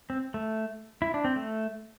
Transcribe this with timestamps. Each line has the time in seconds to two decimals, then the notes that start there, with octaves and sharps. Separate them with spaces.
0.10 C4
0.34 A3
1.02 E4
1.14 D4
1.25 C4
1.36 A3